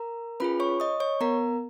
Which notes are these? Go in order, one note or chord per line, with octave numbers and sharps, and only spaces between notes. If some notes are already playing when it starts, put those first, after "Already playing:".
Already playing: A#4 A#5
C#4 F4 G#4 B4 B5
C#5 C#6
D#5 D#6
C#5 C#6
B3 A#4 A#5